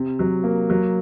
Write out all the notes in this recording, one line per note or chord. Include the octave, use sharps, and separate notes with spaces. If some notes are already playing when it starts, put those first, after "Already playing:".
Already playing: C3
F#3
A#3
F#3